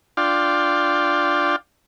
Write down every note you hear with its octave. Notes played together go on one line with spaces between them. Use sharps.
D4 F4 D5 F5 G5 C6